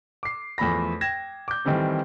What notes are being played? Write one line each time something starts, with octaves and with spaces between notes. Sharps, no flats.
D6 C7
E2 F3 A3 B5 A#6
G5 G#6 A#6 E7
D6 G6
D#3 E3 G3 C4 A4